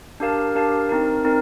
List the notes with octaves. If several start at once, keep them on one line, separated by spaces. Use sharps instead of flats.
D4 G4 A#4 F5 A5
D4 G4 A#4 F5 A5
C4 D#4 A#4
C4 D#4 A#4